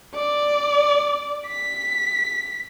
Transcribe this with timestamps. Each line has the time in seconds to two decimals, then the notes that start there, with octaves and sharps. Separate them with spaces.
0.15 D5
1.48 B6